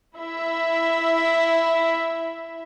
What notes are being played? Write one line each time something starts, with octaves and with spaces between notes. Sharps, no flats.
E4 E5